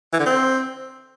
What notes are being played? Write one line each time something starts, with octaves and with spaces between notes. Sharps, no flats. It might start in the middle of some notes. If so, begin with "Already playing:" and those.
E3
D3
C4